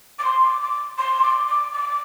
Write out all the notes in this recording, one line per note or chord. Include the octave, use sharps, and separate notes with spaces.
D6
C6
D6
D6
C6
D6
D6
D6